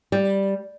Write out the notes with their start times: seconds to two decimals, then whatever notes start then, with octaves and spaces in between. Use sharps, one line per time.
0.12 G3